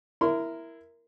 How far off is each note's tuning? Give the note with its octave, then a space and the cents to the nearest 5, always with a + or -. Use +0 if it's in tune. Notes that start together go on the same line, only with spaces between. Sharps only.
E4 +0 A#4 +0 C6 -35